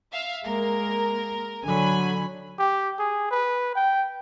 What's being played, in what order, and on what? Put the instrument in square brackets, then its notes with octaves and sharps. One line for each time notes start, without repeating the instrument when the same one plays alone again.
[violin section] E5 F5
[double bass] G#3 A#3 [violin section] A#4
[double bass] D3 F#3 [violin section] G#5 B5
[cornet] G4
G#4
B4
G5